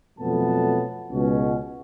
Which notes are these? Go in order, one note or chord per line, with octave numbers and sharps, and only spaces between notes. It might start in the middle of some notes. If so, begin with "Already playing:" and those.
F2 B2 F#3 A3 B3 A5
C#2 B2 C#4